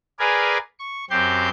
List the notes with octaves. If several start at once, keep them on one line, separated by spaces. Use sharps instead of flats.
G#4 A#4 B4 D5 F5 G#5
C#6
F#2 C4 G4 C6 G6